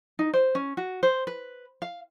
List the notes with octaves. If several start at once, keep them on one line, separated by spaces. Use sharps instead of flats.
D#4
C5
C#4
F#4
C5
B4
F5